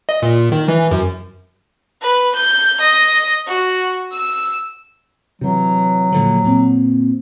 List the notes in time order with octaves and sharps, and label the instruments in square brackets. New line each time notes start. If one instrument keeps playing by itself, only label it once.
[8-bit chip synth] D#5
A#2
D#3
E3
F#2
[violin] B4
G6
D#5
F#4
E6
[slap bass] C3 E3 [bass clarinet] F#3
[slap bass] A#2 D3 F3
A#2 C4